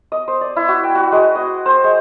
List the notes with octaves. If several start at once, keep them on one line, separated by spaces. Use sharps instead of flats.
D#5
C5
D5
E4
F#4
G5
F#4
G#3
D#5
C5
G#3